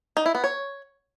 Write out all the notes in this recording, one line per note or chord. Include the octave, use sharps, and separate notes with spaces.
D#4
E4
B3
C#5